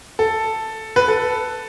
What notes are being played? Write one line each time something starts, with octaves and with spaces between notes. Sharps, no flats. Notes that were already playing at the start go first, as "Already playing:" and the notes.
A4
B4
A4